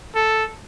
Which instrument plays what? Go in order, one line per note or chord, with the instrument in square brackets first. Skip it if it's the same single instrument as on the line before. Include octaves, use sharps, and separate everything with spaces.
[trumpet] A4